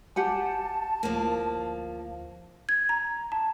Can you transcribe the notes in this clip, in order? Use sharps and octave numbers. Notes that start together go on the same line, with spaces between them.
F#1 G4 F#5 G#5 A5
D2 F3 A#3
G#6
A#5
A5